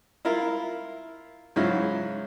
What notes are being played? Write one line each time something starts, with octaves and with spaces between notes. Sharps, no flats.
E4 F4 A#4
G#2 C#3 F#3 E4 F4